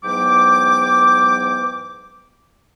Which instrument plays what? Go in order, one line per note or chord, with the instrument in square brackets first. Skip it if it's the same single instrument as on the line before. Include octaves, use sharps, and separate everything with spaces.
[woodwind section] G#2 E3 F#3 B3 G5 D6